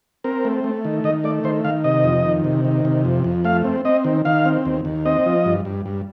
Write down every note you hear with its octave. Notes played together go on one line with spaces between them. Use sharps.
C4 A#4
A3
A3
D#3
D#3 D#5
A3 D5
D#3 C5
D#3 F5
C3 D#5
F2
D#3
C3
D#3
C3
F2
F2
A3 F5
C4
C4 D#5
D#3
D#3 F5
C4
D#2
D#2
C4 D#5
F3
G2
G2
G2